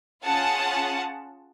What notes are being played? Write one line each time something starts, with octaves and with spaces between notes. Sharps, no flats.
C#4 F4 G#4 F#5 A5